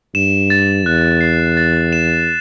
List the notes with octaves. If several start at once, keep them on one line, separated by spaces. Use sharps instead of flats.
G2 E7
A6
E2 F#6
C7
A6
E7